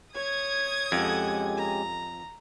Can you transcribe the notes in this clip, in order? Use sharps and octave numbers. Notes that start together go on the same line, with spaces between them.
C#5 D#6 G#6
F2 G#3 C#4 G4 A4 F#5
A#5